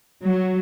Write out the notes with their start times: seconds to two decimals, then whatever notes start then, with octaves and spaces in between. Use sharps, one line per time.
0.24 F#3